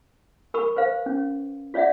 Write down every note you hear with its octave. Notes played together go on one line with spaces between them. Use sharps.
A#4 B5 C#6 E6
B4 C5 F5
C#4
F4 C#5 D5 E5 F#5